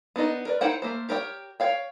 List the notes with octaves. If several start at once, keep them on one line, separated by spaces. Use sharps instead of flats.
B3 D4 D#4 D#5
A#4 B4 D5
D#4 E4 C5 F#5 G5
A3 A#3 C5
G4 A#4 C#5 G5
C#5 F5 G5